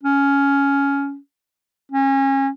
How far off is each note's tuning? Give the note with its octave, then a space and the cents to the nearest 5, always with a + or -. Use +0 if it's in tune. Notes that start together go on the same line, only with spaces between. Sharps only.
C#4 +10
C#4 -30